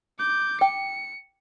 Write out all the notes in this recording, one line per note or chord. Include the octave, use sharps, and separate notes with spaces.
D6 G6
G5 C#7